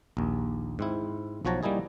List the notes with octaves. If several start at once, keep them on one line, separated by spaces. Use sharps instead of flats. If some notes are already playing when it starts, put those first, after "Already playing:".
A#1 D#2
G#2 C4 E4
B1 F3 F#4 C#5 A5 A#5
G3 A#3 D#4 E4 G#4